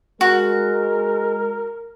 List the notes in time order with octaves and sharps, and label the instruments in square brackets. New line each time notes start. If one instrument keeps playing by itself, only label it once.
[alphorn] G#3 [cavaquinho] F#4 [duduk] A#4